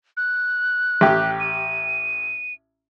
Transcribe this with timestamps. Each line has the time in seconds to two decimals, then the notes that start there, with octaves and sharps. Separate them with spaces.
0.17 F#6
1.01 A1 G4
1.40 D#7